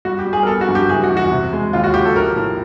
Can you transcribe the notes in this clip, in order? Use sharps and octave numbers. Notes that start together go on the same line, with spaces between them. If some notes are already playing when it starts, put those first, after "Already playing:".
G3 F#4
G4
G3
G#4
A#4
B3 A4
F#4
G2
G4
F#1 G#4
F#4
E2
F#4
C3
G#3
D#2 F4
F#4
C#3 G4
A4
A#1 A#4
A2